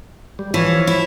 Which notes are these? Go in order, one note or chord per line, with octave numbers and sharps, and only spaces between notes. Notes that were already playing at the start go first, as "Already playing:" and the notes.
G3
E3 F3 C#5
E4